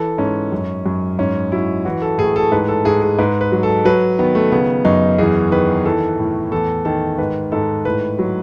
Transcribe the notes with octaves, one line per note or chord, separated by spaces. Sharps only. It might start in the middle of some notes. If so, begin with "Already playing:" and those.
Already playing: E3 A4
G#2 C#4
F#2
F#2
G#2 C#4
F#3 E4
E3 F#4
A4
A2 G#4
A4
G#2 B4
A4
G#2 G#4
G#4
G#2 B4
B4
F#3
A4
F#3 B4
D#3 B3
A3
C#3 B3
F#2 D#4
E2 G#4
D#3 B4
E3 A4
A2
E2 A4
D#3 A4
G#2 B4
G#2 A4
A2 B4
F#3